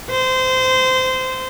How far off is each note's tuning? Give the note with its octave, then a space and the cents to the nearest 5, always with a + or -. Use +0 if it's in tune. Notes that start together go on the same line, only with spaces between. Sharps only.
C5 -20